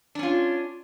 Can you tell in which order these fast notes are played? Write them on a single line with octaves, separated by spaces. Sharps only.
D4 C#4 F4